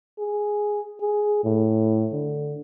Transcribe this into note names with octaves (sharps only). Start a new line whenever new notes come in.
G#4
G#4
A2
D3